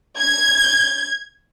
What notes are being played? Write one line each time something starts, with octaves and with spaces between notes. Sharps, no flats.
G#6